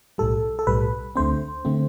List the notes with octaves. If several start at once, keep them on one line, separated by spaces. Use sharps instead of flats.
B1 A2 G3 A4
A4
B1 A2 G3 B4
D2 D3 A3 C4 C5
D3 A3 C4